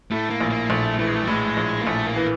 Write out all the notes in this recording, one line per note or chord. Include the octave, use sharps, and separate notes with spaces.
A2 A3
A#3
A#1
A#3
A#1 A3
E3 A3
G#3
A3
G3
A2 G#3
A#1
A#3
A#1 A3
A#3
E3